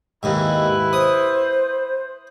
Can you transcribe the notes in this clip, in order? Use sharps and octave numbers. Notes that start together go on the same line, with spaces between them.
D#2 G#2 E4 B4
C5 D#6